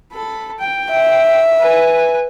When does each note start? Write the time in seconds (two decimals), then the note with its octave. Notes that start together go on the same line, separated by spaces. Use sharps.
0.13 A4 B5
0.59 G5
0.91 E5
1.60 B4 G#5